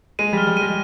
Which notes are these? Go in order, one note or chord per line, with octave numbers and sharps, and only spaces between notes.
G#3 D#7
G3 F6
G3
G#3 D#7